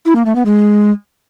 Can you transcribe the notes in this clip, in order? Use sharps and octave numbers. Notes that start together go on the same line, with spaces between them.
E4
A#3
A3
B3
G#3